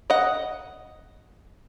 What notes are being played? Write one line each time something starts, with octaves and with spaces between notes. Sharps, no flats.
D#5 F#5